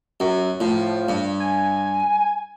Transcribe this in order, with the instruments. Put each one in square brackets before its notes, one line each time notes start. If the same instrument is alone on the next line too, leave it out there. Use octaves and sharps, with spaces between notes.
[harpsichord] F#2 [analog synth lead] F#3
[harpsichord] A2 [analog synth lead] F3
[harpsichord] G2
[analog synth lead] G#5